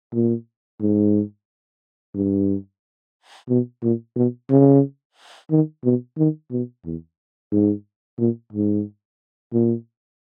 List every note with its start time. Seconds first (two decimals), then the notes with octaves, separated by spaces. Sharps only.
0.14 A#2
0.81 G#2
2.15 G2
3.49 B2
3.83 A#2
4.16 B2
4.50 C#3
5.50 D#3
5.85 B2
6.18 D#3
6.51 B2
6.85 E2
7.52 G#2
8.19 A#2
8.53 G#2
9.53 A#2